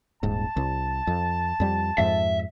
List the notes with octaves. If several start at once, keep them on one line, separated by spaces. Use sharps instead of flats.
D#1 G#2 A5
C2
F2
F2 G3
F2 G#2 E5